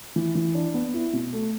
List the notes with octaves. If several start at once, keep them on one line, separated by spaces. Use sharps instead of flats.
E3
E3
D4
B3
E4
B2
A3